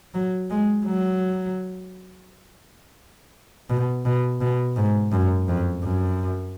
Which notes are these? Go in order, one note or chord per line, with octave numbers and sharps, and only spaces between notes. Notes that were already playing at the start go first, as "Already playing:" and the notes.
F#3
G#3
F#3
B2
B2
B2
G#2
F#2
F2
F#2